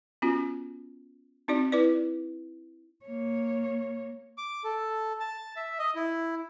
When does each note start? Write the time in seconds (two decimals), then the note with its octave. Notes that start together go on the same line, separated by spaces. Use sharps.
0.22 B3 C#4 F4 F#4
1.48 C4 D#4 F#4 D5
1.72 E4 B4 D5
3.05 A#3 C#5
4.38 D6
4.64 A4
5.20 A5
5.56 E5
5.79 D#5
5.95 E4